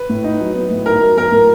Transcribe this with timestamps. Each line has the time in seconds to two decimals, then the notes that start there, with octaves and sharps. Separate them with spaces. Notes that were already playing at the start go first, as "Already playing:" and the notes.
Already playing: B4
0.10 A2
0.24 D#4
0.40 F#3
0.55 B3
0.70 A2
0.86 D#4 A#4
1.02 F#3
1.17 B3 A#4
1.32 A2